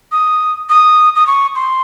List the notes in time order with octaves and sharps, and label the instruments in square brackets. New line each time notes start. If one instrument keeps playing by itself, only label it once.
[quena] D#6
D#6
D#6
C#6
C6